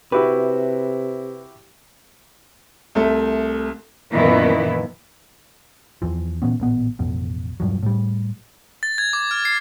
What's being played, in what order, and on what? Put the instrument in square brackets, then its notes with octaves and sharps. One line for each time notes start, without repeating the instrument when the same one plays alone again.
[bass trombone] C3 [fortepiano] E4 F#4 G4 [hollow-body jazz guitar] B4
[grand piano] C2 A3
[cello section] F#2 A#2 D#3 E3 B3 E4
[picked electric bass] E2 E3 F3
A#2 E3 B3 C#4
A1 A#2 B3
A1 F2 B2
E1 G2 F3 F#3
A2 G3
[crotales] A6
G#6
D6
F6
C7